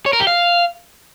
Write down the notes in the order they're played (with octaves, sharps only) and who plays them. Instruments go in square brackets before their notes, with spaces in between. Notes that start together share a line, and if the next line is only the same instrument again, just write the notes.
[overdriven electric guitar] C#5
A#4
G4
F5